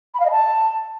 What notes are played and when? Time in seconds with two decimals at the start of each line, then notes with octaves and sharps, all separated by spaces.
0.14 B5
0.20 F5
0.25 D#5
0.31 A5